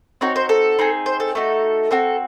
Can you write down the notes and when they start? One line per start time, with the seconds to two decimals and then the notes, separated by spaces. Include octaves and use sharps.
0.21 C4 D#4 F#4 C#5
0.36 C5
0.49 A4
0.79 C4 D#4 G#4
1.06 C5
1.20 A4
1.35 A3 D#4 F#4 A4
1.91 C4 F#4 A4